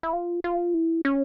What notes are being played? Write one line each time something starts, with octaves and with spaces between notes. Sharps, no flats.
E4
F4
F4
E4
C#4